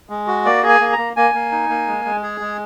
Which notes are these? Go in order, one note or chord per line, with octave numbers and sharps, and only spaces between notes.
G#3
F#4
A#3 D5
G#4
G#5
A#3
A#5
A#3
A#3 G#5
A#3
D#4
A#3
G#3
G#3
G#4
G#3